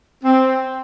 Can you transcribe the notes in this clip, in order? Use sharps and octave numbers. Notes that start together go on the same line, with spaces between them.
C4